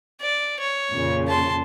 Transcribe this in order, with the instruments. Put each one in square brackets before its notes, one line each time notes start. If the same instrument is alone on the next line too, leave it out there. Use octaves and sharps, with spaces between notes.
[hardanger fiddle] D5
C#5
[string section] F2 A#2 C#3
[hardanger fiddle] A5 C6